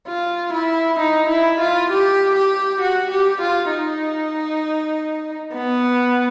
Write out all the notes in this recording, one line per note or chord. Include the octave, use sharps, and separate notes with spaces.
F4
E4
D#4
E4
F4
G4
G4
F#4
G4
F4
D#4
B3